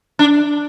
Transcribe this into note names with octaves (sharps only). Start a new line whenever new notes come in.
D4